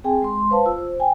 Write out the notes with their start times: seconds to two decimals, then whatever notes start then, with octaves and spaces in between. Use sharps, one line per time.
0.04 C4 G#4 G5 G#5
0.22 G#3 C6
0.51 B4 C5 F5 A5
0.66 F4 E6
0.78 C5
1.00 G5 G#5